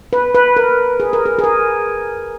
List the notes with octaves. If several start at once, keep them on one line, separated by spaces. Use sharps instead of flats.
B4
B4
A#4
G#4
A#4
G#4
G#4
A#4